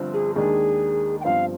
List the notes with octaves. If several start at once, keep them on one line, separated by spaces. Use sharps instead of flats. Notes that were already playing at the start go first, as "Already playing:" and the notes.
Already playing: G1 G2 D3 F3 C4
G#4
D#2 D#3 G#3 D4 G#4
G5
G1 G2 F3 C4 F5